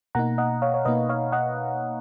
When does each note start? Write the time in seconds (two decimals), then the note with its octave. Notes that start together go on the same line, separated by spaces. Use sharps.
0.15 B2 A#3 D#4 F#5 A#5
0.38 D#5 F#5
0.62 C#5 F5
0.74 C#5
0.85 B2 A#3 D#4 B4 D#5
1.09 C#5 F5
1.32 D#5 F#5